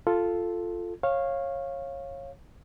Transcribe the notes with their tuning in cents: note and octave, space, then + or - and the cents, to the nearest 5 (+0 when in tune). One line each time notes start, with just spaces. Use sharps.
F4 +0 A4 +0
C#5 -20 F5 +0